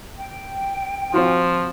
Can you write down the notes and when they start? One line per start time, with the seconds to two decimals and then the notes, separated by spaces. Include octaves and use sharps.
0.17 G5
1.14 F3 C4 F4 F#4